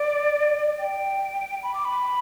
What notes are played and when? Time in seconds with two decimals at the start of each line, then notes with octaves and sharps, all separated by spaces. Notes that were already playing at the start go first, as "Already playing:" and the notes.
Already playing: D5
0.79 G5
1.63 B5
1.74 D6
1.85 B5